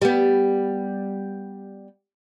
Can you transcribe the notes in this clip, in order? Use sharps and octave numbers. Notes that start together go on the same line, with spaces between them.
G3 B3